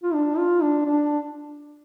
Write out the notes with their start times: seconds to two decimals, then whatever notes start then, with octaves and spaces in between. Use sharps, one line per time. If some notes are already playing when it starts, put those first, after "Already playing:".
0.03 F4
0.14 D4
0.38 F4
0.62 D4
0.85 D4